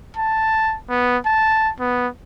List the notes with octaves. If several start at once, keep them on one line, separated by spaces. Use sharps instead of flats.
A5
B3
A5
B3